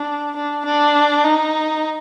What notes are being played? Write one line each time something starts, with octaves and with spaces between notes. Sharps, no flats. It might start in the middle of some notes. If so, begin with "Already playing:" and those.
Already playing: D4
D4
D4
D#4